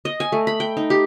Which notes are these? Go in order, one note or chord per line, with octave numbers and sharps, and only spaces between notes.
D#5
G#5
A3
B5
G5
D#4
G4